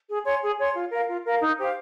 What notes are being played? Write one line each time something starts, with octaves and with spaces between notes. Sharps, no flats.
G#4
C#5 G#5 C6
G#4
C#5 G#5 C6
F4
A#4 F5
F4
A#4 F5
D#4
G4 C5 F5